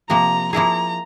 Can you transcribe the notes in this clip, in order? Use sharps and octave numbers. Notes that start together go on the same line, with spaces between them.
C3 F3 A#3 A#5
F3 A#3 E4 G#4 A#5